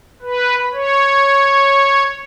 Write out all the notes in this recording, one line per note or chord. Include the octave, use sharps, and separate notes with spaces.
B4
C#5